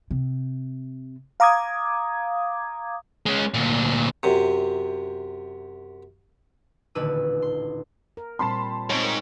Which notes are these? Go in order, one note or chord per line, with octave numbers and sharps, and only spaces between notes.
C3
F5 A#5 D6 D#6 G#6
G#3 C#4
D2 A#2
F#2 C3
D#1 A1 D3 B4 E6 D#7
C6
A#4
A#2 G3 C4 A5 B5 C6
G#2 C4 C#5
A#4